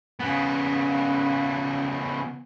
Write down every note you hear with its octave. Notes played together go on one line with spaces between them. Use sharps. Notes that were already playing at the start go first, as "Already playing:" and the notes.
C#3 B3